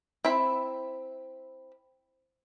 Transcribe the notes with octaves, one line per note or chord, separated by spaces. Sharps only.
C4 E4 B5